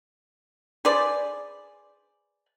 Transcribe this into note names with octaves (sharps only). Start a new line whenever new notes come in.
G#4 B4 C5 D5